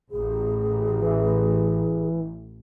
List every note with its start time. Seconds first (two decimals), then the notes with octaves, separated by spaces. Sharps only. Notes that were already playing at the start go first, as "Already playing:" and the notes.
0.11 A1 G#4
1.00 E3